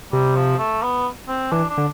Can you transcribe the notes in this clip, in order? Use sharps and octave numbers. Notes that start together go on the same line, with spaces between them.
C3 G3
F3
A3
B3
C4
E3 D4
D4
D3